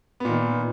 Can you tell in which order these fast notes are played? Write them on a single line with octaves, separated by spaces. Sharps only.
B3 A#2 D#3